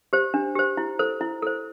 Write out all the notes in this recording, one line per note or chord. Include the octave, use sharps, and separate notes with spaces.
G4 C5
D4
G4 C5
E4
A4 C5
E4
A4 C5